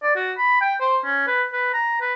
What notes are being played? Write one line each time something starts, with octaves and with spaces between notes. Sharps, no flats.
D5
F#4
B5
G5
C5
C#4
B4
B4
A#5
B4